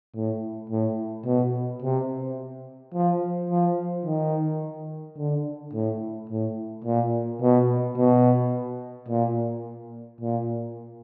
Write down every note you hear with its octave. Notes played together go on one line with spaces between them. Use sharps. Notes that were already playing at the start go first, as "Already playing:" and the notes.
A2
A2
B2
C3
F3
F3
D#3
D3
A2
A2
A#2
B2
B2
A#2
A#2